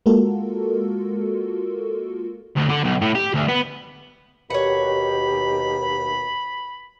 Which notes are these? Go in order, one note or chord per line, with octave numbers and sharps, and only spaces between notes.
G#3 A#3 F4 F#4 A4 A#4
D2
D3
B1
A2
G4
D2
B3
D#2 B2 G4 C#5 F#5 B5